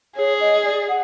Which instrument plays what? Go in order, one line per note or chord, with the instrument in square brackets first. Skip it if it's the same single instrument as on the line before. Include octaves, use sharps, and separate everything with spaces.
[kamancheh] G#4 [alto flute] C#5
[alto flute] D#5
D5
F#5